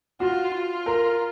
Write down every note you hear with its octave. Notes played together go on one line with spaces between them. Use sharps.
F4 F#4
F4
A#4